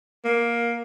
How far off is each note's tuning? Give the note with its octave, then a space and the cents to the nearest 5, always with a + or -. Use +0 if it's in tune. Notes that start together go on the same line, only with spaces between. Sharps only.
A#3 +10